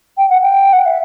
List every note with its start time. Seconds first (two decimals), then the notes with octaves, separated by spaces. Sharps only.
0.18 G5
0.30 F#5
0.42 G5
0.73 F#5
0.86 E5